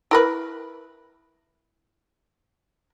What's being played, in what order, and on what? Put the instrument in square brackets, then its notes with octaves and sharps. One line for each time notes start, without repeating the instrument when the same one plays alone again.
[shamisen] E4 A#4 B4